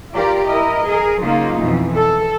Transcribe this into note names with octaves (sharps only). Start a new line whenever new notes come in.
F4 G4 A#4 D5
E4 A#4 D#5
G#4 A#4
C#3 F#3 A#3 D#4 F4
F2 B2 E3
A4